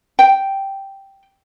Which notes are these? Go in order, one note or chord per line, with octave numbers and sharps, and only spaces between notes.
G5